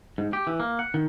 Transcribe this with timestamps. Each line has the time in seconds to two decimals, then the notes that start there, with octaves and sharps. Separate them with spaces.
0.18 G#2
0.33 G4
0.47 E3
0.60 A#3
0.79 F#5
0.94 D#3